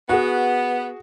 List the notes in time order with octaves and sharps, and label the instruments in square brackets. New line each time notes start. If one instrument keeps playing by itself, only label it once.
[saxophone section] B3 [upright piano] F#4 G#4